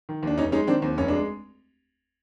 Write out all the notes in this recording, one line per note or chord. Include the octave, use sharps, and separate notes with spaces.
D#3
D#2 D4
F1 C#4 D#4
G#3 C#4 D#4
D#3 C4 D4
D#2 C4
F1 C#4
G#3 D4